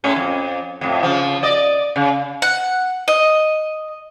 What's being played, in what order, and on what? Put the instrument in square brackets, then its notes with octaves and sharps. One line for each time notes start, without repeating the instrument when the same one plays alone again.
[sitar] A2 G#3 C#4
F2
F2 A2
C#3 F3
D5 D#5
C#3
[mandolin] F#5
D#5